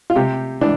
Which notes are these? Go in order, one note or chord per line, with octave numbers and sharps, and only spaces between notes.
F4
C3 G4
E3 D4